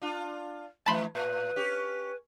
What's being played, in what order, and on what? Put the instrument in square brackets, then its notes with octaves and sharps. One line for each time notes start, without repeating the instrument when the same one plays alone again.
[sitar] D4 F4
[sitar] F2 E3 [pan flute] A3 [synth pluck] A5 B5 C6
[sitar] A2 [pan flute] B4
[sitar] C#4 G4